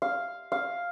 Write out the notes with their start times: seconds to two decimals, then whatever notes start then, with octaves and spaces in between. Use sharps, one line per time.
0.02 F5
0.52 F5